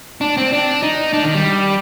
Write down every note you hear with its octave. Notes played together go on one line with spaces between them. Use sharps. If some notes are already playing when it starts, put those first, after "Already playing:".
D4
C4
D4
D#4
D4
D#3
G3